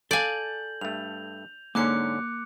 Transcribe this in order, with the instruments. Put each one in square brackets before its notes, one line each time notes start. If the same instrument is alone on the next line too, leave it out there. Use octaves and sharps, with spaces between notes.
[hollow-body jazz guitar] A4 F5 [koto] D5 G#5 [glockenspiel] G6 F#7
[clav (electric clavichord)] G2 A3 [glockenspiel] F7
[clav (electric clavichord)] G#2 D3 C#4 [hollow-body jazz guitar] A#3 [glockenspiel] D6 F#6 C#7